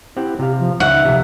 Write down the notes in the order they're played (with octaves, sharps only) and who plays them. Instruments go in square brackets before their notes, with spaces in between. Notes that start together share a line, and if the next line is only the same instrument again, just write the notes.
[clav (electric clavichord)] C4 G4 F#5 [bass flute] E4
[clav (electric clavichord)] C3 F5 [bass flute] G4
[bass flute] F3
[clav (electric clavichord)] C#2 [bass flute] E5 [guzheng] F#5
[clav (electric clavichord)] B1 F2 C3